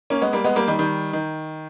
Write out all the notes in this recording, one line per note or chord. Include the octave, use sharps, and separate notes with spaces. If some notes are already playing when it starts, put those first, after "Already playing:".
A#3 C#4
G#3 B3
G3 A#3
G#3 B3
G3 A#3
D#3 G3
D#3 G3
D#3